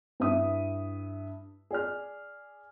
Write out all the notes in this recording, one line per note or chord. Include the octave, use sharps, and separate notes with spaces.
G2 E4 E5 D#6
G#4 D5 F6